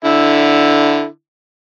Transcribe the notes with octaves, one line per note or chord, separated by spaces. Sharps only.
D3 E4